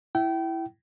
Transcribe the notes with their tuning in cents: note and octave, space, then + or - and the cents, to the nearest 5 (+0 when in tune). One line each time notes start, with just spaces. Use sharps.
E4 +5 G5 -30